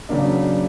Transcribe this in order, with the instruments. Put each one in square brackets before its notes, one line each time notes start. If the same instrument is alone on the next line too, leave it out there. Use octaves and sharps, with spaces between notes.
[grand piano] C#3 F#3 A#3 D4